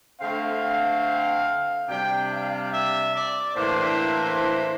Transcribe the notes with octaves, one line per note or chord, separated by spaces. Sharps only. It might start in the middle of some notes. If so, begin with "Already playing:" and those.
D3 A3 C4 F5
C3 G3 D4 G5
F5
E5
D5
A2 E3 A#3 D4 C5